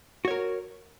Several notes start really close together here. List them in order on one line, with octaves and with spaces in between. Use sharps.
F#4 C#5 A#4